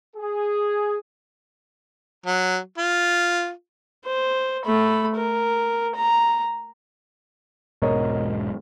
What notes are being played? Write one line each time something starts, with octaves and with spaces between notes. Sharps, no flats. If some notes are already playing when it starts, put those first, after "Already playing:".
G#4
F#3
F4
C5
A3 B5
A#4
A#5
E1 G#2 B2 A#4 C#5 D#5